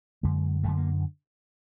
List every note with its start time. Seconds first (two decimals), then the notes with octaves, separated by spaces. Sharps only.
0.23 F#2 D3 G#3
0.63 F#2 D3 A3
0.77 A#3